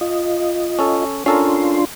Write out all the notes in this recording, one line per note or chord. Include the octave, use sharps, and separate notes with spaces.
F4 D#5
C#4 A4
C#4 D4 F4 A4 A#4 C6